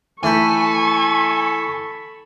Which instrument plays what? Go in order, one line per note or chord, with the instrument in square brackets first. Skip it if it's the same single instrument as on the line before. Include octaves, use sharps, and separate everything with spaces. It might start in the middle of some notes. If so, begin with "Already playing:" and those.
[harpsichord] E3 A3 G5 [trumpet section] A4 B5 [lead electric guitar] G#5 [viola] C#6